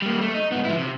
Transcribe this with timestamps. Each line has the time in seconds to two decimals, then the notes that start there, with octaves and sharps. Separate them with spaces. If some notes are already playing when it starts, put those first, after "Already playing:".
0.02 G3 A#3
0.21 A3
0.34 D#4
0.52 G#2 B3
0.65 F3 E4
0.78 C3